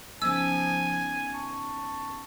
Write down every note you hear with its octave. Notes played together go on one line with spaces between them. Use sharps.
C#3 F3 B3 D#4 G#5 E6
A5 C#6